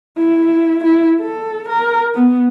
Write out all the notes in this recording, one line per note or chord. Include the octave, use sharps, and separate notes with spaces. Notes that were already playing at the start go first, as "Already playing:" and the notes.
E4
E4
A4
A#4
B3